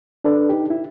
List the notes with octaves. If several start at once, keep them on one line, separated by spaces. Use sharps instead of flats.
D4 A4 B4 D5
D#4 G4
E4